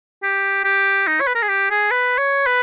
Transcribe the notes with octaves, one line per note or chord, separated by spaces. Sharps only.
G4
G4
D#4
C#5
B4
A#4
G#4
G4
G#4
B4
C#5
B4